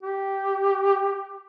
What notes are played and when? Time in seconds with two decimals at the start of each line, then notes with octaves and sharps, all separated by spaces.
0.03 G4